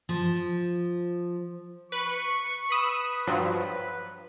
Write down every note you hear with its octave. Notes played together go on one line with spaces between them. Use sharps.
F3
B4 C#6
B4 B5 D#6 E6
G2 F3 F#3